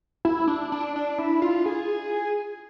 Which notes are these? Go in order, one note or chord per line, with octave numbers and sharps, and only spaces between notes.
E4
D4
D4
D4
E4
F4
G#4